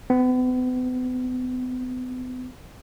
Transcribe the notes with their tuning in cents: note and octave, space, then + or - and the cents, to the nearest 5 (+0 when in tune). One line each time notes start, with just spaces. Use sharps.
B3 +40